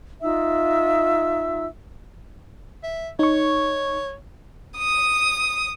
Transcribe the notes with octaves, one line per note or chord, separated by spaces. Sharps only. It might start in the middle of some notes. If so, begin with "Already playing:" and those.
D#4 F4 E5 E6
E5
D#4 C#5 C#6
D#6